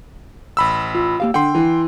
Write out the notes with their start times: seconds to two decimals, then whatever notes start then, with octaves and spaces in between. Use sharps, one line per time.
0.57 A1 B5 E6
0.95 F4
1.20 A#3 G4 F5
1.34 D3 F#5 G5 C6
1.54 E3